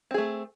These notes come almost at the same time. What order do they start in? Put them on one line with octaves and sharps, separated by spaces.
C4 G#4 A3